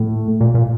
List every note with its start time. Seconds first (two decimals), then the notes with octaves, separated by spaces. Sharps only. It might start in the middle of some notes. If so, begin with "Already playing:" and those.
Already playing: A2
0.41 A#2
0.55 A#2